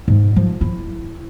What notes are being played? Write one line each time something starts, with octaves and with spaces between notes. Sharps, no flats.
G#2
F3
E4